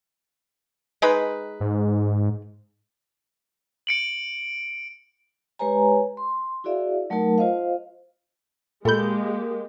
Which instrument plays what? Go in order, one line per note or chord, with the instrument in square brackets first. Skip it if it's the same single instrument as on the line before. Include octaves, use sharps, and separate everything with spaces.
[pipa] G#3 D#4 B4
[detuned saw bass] G#2
[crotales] C#7 D7 F#7
[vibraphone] G#3 G4 B4 C#5 G#5 A#5
C6
E4 F#4 G#4 D5 E5 F5
F#3 A3 D#4 A#4 A5
F4 C5 D#5 F5
[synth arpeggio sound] A#2 G6 [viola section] G#3 G4 [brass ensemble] A#3 [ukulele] A4 B5